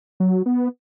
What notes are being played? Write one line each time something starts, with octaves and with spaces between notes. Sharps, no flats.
F#3
B3